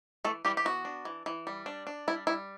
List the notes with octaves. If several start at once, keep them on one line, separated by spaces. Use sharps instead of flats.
E3 A3 A4
E3 G3 G4
G4
B3 F#4
D4
E3
E3
G3
D4
D4
G3 E4
G3 E4